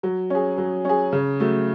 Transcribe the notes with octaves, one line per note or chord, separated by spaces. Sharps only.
F#3
C#4 G#4
F#3
C#4 G#4
C#3
F#3 A3